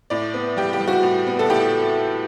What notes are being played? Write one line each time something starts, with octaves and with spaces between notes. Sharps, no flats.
A2 D5
B3
G3 G4
G4
G3
F#4
A2
B3
A4
A2 G4